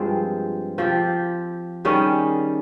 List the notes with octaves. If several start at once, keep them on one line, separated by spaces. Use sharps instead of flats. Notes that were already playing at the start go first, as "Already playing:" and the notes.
Already playing: G2 F3 G#3 C4
F3 C4 G4
D#3 G3 C#4 G#4